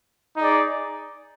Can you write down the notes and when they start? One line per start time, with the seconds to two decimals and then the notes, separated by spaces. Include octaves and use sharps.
0.37 D#4 G#4 D5